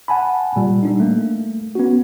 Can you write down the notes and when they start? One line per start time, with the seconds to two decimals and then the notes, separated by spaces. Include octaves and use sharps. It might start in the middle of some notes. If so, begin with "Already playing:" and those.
0.08 F#5 G#5 A5 B5
0.56 A#2 G3
0.83 G3 D4 D#4
1.00 A3 A#3
1.75 B3 C#4 F#4